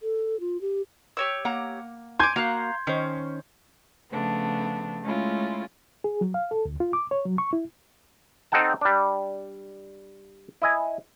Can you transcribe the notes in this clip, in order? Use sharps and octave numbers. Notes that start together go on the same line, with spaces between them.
A4
F4
G4
G4 C#5 E6
A#3 F#5 A#5
G#5 C6 D6 G6 G#6
A#3 F#4 F5 A#5 F#6
D#3 C#4 C5
C#3 F3 A3 B3 D4
G#3 A3 C#4 E4 F4
G#4
F#3
F5
A4
D2
F4
D6
C#5
F#3
C#6
E4
C4 D#4 A4 F#5 G5 A5
G3 D4
E4 D#5 G#5